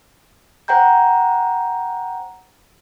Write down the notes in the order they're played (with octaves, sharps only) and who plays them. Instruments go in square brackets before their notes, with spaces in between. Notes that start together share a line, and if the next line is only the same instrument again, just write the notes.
[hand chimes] C5 F#5 G5 A#5 G6